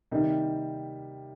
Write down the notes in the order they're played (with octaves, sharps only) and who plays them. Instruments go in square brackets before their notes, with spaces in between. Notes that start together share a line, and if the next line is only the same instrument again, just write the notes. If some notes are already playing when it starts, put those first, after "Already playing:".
[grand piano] C3 D#3 G3 A#3 D#4